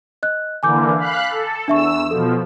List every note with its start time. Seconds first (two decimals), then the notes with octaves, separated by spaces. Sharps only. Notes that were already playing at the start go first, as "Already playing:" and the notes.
0.23 D#5 F#6
0.63 D3 E3 A#3 G#5 D6 G6
0.97 F5 B5 F#6
1.28 A4
1.68 E2 D4 E5 C#6 E6
2.11 B2 F3 A4